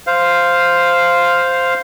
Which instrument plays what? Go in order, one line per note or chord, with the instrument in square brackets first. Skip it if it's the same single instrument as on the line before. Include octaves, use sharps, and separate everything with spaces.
[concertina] C5 F5